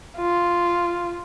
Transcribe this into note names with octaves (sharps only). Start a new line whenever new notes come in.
F4